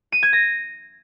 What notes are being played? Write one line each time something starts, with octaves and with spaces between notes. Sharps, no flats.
D#7
G#6
A#6